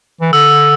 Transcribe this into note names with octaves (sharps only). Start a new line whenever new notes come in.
E3
D3 E6